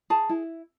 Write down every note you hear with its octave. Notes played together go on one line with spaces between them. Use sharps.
G#4 A5
E4